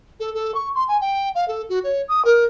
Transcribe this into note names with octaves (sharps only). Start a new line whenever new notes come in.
A4
A4
C#6
C6
G#5
G5
F5
A4
F#4
C#5
D#6
A#4